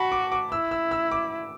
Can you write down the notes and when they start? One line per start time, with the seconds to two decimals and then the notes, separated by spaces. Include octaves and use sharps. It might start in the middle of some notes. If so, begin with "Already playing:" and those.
Already playing: F#4 A5 B5
0.12 D6
0.32 D6
0.52 E4 E6
0.71 E6
0.91 E6
1.11 D6